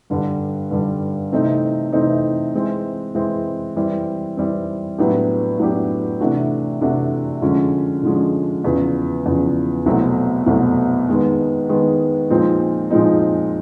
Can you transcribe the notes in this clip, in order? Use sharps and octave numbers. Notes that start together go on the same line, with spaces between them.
G2 D3 G3
G2 D3 G3
C3 E3 A3 C4 D#4
C3 E3 A3 C4 D#4
E3 G#3 C4
E3 G#3 C4
E3 G3 C4
E3 G3 C4
A2 F#3 B3 D4 G4
A2 F#3 B3 D4 G4
C3 E3 A3 D4 F#4
C3 E3 A3 D4 F#4
D3 F3 G#3 C#4
D3 F3 G#3 C#4
E2 C#3 F3
E2 C#3 F3
C2 B2 F#3 A3 C4
C2 B2 F#3 A3 C4
D#3 G#3 B3
D#3 G#3 B3
A#2 F3 G#3 C4 D#4
A#2 F3 G#3 C4 D#4